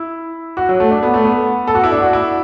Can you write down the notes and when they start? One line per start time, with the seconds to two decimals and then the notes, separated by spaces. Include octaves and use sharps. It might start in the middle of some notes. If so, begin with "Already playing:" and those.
Already playing: E4
0.57 F#4
0.69 F#3
0.80 A3
0.90 D4
1.03 B3
1.14 A3
1.24 B3
1.67 A4
1.75 F#4
1.84 E4
1.92 D4
2.02 F#4
2.13 E4